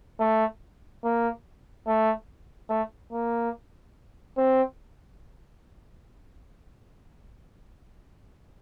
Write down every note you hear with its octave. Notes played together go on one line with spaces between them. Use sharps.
A3
A#3
A3
A3
A#3
C4